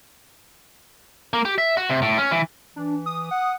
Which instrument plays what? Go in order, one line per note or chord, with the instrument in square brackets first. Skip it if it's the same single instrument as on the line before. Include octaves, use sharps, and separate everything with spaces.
[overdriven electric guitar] A#3
G4
E5
F#4
C3
A2
C#4
E3
[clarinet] E3 [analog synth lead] D4
[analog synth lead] D#6
[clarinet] F#5